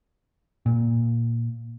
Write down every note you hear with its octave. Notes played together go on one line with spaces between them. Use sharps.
A#2